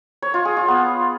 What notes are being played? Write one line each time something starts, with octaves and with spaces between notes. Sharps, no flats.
C#5
F4
G#4
F4
B3